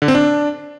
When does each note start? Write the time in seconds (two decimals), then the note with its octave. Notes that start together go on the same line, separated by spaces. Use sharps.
0.02 D3
0.08 C4
0.15 D4